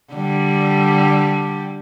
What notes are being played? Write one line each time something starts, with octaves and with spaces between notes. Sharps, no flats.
D3 G3